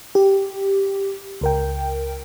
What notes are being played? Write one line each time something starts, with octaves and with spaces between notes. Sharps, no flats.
G4
C#2 A#4 G5